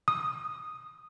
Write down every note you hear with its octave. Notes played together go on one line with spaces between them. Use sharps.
D#6